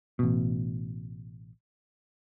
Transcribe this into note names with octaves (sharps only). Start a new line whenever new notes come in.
A1 B2